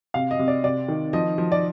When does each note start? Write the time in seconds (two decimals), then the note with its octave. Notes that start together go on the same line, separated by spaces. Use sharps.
0.14 C3 F5
0.31 D#5
0.39 C3
0.48 D5
0.64 C3 D5
0.88 D#3
1.13 F3 D#5
1.38 F3
1.52 D5